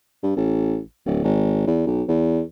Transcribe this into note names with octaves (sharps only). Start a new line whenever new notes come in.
G2
A1
D1
G#1
E2
B1
E2